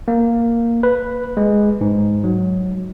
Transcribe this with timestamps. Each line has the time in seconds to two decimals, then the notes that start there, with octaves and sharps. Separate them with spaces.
0.08 A#3
0.83 B4
1.37 G#3
1.81 G#2
2.24 F#3